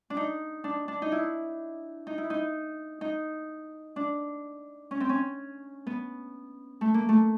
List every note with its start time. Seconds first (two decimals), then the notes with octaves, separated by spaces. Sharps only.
0.10 D4
0.17 D#4
0.64 D4
0.88 D4
1.02 D#4
1.12 E4
2.07 D#4
2.18 E4
2.30 D#4
3.01 D#4
3.96 D4
4.91 C#4
5.00 C4
5.09 C#4
5.87 B3
6.81 A3
6.94 A#3
7.09 A3